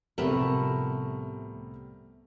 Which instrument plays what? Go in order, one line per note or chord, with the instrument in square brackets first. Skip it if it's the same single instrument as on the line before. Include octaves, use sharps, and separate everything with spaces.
[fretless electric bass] C2 A2 F3 [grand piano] C3 G3 A#4 [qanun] A3 B3